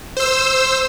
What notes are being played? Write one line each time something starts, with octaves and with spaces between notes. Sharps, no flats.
C5 E6